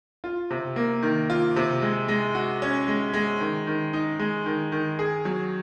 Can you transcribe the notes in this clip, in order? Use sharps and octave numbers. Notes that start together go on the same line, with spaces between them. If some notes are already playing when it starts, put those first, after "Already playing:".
F4
C3
A#3
D#3
F4
C3
G#3
G#3
F#4
C#4
G#3
G#3
D#3
D#3
D#4
G#3
D#3
D#3
G#4
F#3